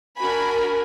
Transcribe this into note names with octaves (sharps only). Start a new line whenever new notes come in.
D4 F#4 A#4 G#5 B5